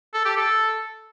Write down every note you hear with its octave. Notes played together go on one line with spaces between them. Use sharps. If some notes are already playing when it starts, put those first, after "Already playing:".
A4
G4
A4